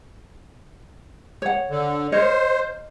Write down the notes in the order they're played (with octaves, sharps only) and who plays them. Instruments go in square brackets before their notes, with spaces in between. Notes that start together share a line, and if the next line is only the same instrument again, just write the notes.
[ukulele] C#5 F#5
[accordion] D3
[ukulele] A#4 C#5 D#5 [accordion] C5